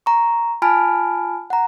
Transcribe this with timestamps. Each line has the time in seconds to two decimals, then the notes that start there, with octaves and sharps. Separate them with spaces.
0.06 A#5 C#6
0.62 F4 G#5 A5 B5 F6 D7
1.50 F#5 A#5